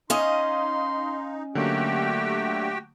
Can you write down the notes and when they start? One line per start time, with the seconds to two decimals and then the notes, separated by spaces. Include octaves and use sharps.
0.10 C#4 D#4 D#5 F5 C6 D#6 D#7
1.55 D3 F#3 A3 A#3 F#4 G4 G5